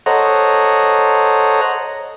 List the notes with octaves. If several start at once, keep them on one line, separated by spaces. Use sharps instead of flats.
A4 C5 C#5 D#5 F#5 A#5